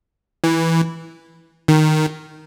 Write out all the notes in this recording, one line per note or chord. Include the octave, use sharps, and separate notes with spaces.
E3
D#3